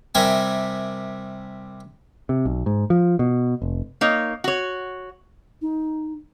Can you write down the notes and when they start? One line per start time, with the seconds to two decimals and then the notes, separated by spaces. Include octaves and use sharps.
0.15 C3 G3 A#4 E5 G#5
2.29 C3
2.45 B1
2.66 G#2
2.90 F3
3.19 B2
3.62 F1
4.01 A#3 D#4 C#5
4.44 F#4 C#5
5.62 D#4